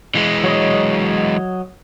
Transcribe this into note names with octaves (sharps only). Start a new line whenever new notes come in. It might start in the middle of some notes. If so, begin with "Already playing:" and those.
E3 G#3
F#3 C#5 D#5